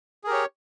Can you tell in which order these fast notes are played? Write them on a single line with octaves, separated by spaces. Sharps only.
G#4 A#4 G4 C#5